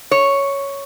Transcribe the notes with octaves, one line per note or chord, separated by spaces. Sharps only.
C#5